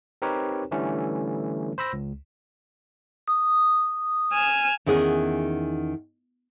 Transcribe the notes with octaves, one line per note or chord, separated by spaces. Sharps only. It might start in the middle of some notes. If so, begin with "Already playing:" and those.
C4 D#4 G4 A#4 B4 C#5
D3 E3 G3 A3 C#4
C5 B5 E6 A#6
C#2
D#6
G#5 E6 F6
E2 D#3 C#4 G#4 F#5